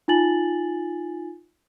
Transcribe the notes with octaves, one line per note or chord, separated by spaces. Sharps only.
D#4 F4 G#5 A6 F#7